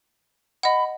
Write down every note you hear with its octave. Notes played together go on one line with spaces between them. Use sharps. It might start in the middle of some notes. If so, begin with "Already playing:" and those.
D#5 F#5 B5